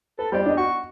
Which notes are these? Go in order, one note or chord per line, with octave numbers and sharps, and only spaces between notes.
A4 B4
G3 G4 C5 D5
D4 D#5
F#4 C#6